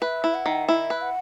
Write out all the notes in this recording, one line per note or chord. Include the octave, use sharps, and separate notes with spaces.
B4 E5
E4
F#5
D#3
E4 E5
B4
F#5